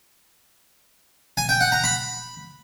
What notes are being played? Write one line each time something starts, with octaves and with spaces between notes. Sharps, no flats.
G#5
G5
F#5
A#5
B5